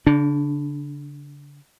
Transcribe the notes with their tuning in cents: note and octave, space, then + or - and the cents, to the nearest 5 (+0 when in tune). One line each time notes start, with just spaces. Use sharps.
D3 -45 D4 +0